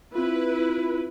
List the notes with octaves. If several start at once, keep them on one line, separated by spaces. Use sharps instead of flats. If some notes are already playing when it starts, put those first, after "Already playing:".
C4 E4 F4 B4